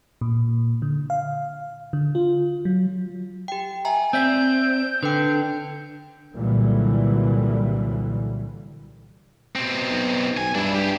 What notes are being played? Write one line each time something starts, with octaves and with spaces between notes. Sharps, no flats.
A#2
D3
F5
D3
F4
F#3
G4 G5
E5 G#5 A#5
C4 D5 E5 G6 B6
D3 B4 G5
C2 A#2 D3 E3 F#3 G3
B2 C4
B1
B1 G#5
G2 D4 E4
G4 G#4